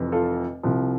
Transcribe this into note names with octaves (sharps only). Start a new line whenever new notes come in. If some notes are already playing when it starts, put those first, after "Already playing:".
Already playing: F1 F2 C3 E3
F4 A4
C2 C3 F3